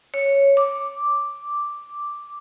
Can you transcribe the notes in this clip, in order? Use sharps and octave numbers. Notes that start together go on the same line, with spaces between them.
C#5
D6